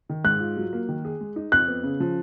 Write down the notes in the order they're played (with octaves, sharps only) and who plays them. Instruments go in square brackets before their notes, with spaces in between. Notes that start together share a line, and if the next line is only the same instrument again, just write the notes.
[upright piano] D#3
[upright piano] G#2 [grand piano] F#6
[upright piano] F4
F#3
A#3
D#3
G#4
G#3
D#4
[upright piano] F2 [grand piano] F#6
[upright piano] B3
C#3
F3